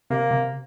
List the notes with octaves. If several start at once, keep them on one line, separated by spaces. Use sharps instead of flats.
C3 A#3
C3